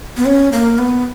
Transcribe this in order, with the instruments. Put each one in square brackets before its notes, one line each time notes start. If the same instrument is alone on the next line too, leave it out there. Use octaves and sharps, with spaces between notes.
[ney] B3
C#4
A#3
B3